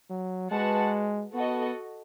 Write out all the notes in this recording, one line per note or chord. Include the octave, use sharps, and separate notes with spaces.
F#3
G#3 F#4 B4 F#5 A5
B3 F#4 A4 D#5